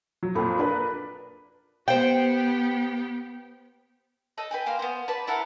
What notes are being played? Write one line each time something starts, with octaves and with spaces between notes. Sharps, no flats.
F#3
F2 A#2 A4 B4
D4 A#4 B4
B3 G4 C5 G5
A4 D#5 E6
B4 G5 G#5
A#3 F5 C6
B3 C5
B4 D5 A5
E4 A4 A#4 F#5